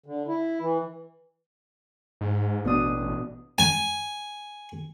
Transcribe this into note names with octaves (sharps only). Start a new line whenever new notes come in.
D3
E4
E3
G#2
A1 B2 D4 D#6
G#5